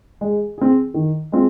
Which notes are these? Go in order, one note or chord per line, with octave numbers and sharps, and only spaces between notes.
G#3
C4 G#4
D#3
G#3 C4 F4